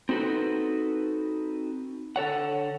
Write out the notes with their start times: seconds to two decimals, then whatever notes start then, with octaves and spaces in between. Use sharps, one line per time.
0.09 C4 D#4 F#4 A4 B4
2.16 D3 A4 C#5 F#5